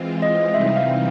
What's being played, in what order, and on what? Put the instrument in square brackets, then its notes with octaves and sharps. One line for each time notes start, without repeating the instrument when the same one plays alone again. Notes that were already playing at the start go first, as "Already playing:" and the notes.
Already playing: [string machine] E3 G#3 C4 F4
[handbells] D#5
[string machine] C3 E3 G3 C4 D#4 [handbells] E5
[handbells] F5